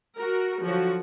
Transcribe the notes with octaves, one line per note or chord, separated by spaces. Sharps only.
F#4 A#4
D3 F3 F#3 F#4